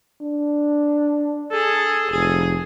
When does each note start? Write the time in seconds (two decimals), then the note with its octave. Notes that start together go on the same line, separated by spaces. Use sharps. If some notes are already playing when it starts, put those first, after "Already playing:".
0.22 D4
1.52 G#4 A4
2.12 F1 G#4